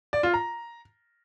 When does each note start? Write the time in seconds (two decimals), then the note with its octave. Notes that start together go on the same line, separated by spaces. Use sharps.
0.13 D5
0.23 F4
0.34 A#5